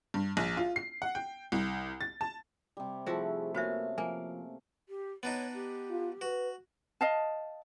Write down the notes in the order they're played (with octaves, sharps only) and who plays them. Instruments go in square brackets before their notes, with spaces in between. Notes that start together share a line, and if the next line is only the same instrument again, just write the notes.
[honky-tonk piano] G2
A#1
F4
C7
F#5
G5
C2
A6
A5
[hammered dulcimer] C3 G3
[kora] F3 F#4 [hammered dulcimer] A3 E4 [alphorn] G#4
[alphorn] A#3 [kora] B3 C#4 [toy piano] F#4 C5 E5 [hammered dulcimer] F5
[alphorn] F3 [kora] A#3 [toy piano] G#5
[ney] G4
[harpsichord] B3 D4 D#4 [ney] C#5
[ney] G4
[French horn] F4
[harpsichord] F#4 [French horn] B4
[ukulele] D#5 F5 A5